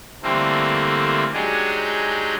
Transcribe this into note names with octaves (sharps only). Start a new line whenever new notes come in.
D3 E3 G3 A3 A#3 C4
F#3 G#3 D4 D#4 G4 G#4